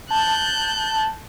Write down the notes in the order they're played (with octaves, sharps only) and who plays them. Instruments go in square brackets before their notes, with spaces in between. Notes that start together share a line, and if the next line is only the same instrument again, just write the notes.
[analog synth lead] A5 [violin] F#6 G6